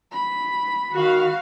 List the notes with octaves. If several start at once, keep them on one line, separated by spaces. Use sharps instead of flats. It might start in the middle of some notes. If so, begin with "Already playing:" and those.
B5
D#3 F#4 F5